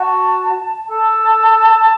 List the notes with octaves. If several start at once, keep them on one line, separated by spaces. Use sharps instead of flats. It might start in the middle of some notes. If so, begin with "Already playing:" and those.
Already playing: F#4 A5
A4 A5